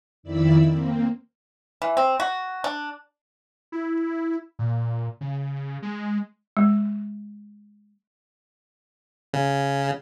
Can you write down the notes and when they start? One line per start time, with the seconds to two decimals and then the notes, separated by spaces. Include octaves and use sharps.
0.23 F2 D#3 E4 D5 B5 E6
0.68 A#3 C4
1.82 E3
1.97 C4
2.20 F#4
2.64 D4
3.72 E4
4.59 A#2
5.21 C#3
5.82 G#3
6.57 G#3
9.34 C#3